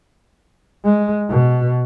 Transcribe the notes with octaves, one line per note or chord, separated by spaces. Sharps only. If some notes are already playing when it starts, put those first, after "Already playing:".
G#3
B2